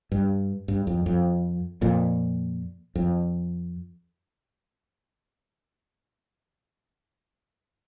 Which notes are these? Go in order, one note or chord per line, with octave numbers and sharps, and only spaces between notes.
G2
G2
F2
F2
F2 A#2
F2